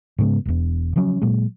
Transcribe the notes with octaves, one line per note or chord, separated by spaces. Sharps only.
G#2 C#3 G#3 B3
E1 E2
C#3 F3 F#3 C#4
A#2 F#3 G#3